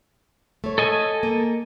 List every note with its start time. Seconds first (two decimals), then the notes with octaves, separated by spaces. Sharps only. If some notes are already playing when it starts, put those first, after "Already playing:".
0.64 A3 C#5
0.78 A4 D#5 G#5
1.23 A#3